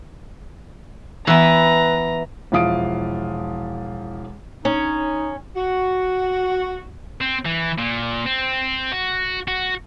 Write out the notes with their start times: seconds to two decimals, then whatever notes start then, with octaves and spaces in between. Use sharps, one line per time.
1.27 E3 B3 B4 E5 A#5
2.52 E1 E3 F3 F5 D#6 D7
4.65 C#4 D#4
5.55 F#4
7.21 C4
7.46 E3
7.78 A#2
8.27 C4
8.92 F#4
9.48 F#4